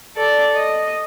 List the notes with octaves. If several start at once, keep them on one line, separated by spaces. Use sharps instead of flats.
A4 D5
D#5